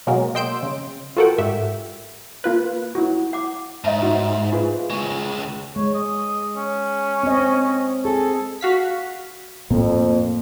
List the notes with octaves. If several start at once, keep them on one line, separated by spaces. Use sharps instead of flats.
B2 F#3 G#3 A#3 F#4 A#4
D#5 G5 C6 E6 G6 D7
C#3
F4 F#4 A4 A#4 F#5 G5
G#2 G4 E5
A#3 F4 B4
E4 F#4
F#5 D6
G#2 D#5 E5 A5
D#4 F#4
F4 G#4 B4
C#2 G#3 C#6
G#3 C#5
D#5
C#4
C4 D#5
G#4 A4
F#4 F5 B6
F2 A2 A#3 C4